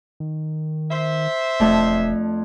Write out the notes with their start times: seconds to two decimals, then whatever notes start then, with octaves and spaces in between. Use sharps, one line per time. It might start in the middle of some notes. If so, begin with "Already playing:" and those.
0.20 D#3
0.91 C5 E5
1.60 E1 F2 A3 D4